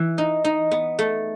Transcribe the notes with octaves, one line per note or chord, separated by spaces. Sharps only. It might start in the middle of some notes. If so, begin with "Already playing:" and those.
Already playing: E3
D#4
D#4
B3
A3